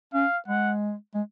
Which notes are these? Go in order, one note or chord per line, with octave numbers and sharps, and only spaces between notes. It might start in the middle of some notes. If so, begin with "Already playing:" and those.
C#4 F5
G#3 F#5
G#3